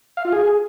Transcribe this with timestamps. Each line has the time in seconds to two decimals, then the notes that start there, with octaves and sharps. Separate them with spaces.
0.17 F5
0.25 F4
0.32 G#4